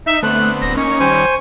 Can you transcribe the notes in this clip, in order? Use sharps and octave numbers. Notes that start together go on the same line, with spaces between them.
D#4 E5
D3 A3 B3 C4 F#6
D1 A#6
A#3 C#4 D#4 C#6
D#3 G3 C5 G#5